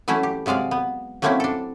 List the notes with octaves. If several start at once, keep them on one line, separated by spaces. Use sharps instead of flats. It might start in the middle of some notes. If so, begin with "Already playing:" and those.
E3 F#3 A3 C#4 E4
G4
C3 F#3 G#3 D5 F5
B3
F#3 A3 A#3 C4 C#4 E4
D4 A4